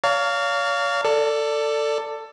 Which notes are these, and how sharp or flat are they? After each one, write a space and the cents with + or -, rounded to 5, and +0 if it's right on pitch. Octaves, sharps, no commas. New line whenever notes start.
C#5 +40 F5 +0 A#5 -40
A4 +20 D5 +0